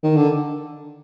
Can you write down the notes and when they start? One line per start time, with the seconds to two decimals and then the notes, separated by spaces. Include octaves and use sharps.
0.03 D#3
0.17 D3